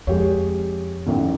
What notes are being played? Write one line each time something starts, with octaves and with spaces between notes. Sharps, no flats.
F2 G#3 G4 C#5
A1 D#2 D3